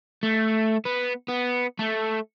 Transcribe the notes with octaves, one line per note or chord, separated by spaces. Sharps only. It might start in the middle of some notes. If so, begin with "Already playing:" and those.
A3
B3
B3
A3